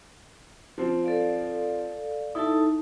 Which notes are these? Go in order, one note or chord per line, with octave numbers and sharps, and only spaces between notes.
F3 C4
A4 D5 F5
D#4 E4 A4 A5